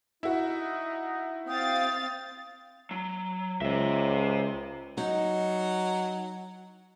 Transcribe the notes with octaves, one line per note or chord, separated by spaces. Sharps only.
D#4 E4 F#4
C4 F5 G5 D#6 A6
F#3
C#2 C5 E5
F#3 D#4